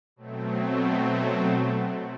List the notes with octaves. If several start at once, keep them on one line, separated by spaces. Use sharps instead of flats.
B2 F#3 A3 C4